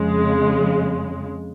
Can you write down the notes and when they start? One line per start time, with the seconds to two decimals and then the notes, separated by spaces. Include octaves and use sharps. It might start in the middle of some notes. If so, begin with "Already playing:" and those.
Already playing: F2 C#3 G#3